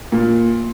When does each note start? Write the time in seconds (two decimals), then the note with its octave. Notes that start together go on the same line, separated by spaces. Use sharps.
0.12 A#2